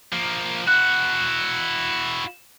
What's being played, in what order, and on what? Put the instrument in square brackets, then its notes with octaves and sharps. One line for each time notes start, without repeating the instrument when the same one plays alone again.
[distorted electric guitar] F3 A#3
[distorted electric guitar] E4 F#4 [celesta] F#6